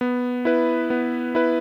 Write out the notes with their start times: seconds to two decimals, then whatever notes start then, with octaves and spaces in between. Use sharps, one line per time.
0.01 B3
0.45 E4 B4
0.90 B3
1.35 E4 B4